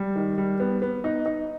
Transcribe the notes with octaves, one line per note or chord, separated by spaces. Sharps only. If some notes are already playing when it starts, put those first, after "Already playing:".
Already playing: G3
D#3
G3
B3
B3
D#4
D#4